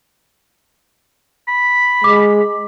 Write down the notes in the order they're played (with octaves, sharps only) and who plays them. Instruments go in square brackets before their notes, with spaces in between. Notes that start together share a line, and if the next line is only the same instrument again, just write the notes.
[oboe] B5
[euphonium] G#3 [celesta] D6